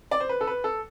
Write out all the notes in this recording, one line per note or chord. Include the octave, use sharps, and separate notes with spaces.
D5
C5
B4
A4
B4
A4